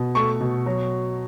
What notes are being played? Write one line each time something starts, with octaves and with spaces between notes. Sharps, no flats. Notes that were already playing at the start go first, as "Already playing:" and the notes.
Already playing: B2
A3 C#6
B2
F#3